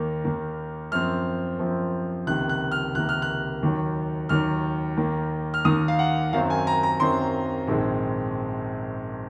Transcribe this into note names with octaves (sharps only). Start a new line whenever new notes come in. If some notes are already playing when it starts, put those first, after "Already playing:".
Already playing: D#2 D#3 A#3
D#2 D#3 A#3
F#2 F3 C4 F6
F#2 F3 C4
C#2 C3 D#3 A#3 F#6
F#6
F6
C#2 C3 D#3 A#3 F#6
F6
F#6
D#2 D#3 F#3
D#2 D#3 F#3 F6
D#2 D#3 A#3
F6
D#2 D#3 A#3 D#6
F5
F#5
F#2 D#3 F#3 C4 F5
G#5
A#5
A#5
F#2 D#3 F#3 C4 C6
A#1 G#2 D#3 G#3 C4